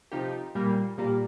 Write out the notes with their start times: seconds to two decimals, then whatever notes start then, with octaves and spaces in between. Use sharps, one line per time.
0.12 C3 F3 D#4 G4
0.55 A#2 G3 A#3
0.98 A#2 G3 A#3